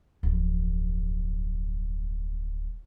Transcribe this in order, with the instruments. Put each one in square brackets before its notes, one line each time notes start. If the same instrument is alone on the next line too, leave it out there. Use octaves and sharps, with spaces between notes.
[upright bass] D1 F2